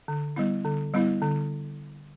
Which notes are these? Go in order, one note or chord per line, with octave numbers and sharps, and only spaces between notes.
D3
G3 B3 E4
D3
G3 B3 E4
D3